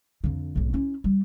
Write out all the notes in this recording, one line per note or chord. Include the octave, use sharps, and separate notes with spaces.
F2 D3
B1 G#2
C#4 E4
G3